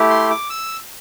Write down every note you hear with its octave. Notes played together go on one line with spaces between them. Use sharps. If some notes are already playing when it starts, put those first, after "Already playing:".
Already playing: A3 E4 G4
C6
D6
E6